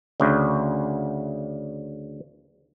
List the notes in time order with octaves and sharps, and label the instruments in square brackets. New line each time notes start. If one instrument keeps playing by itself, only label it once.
[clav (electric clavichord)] D2 C#3